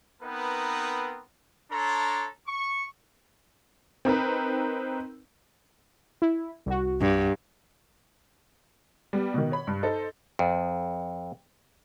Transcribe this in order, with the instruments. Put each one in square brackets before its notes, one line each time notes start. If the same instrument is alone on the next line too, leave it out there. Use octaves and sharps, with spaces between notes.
[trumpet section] B3 C4 D#4 A#4 B4
D4 A4 C#5 A#5 C6
C#6
[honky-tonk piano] C4 D#4 A#4 B4
[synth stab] E4
C2 F#4
[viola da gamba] G2
[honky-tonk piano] G3 B3
B2 D#3
C#5 B5
G2
D#4 A4 C5
[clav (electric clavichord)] F2